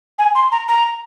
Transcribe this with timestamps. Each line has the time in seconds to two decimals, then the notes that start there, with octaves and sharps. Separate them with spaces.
0.19 G#5
0.35 C6
0.52 A#5
0.68 A#5